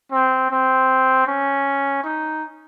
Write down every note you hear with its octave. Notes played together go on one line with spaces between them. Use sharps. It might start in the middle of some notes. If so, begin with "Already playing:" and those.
C4
C4
C#4
D#4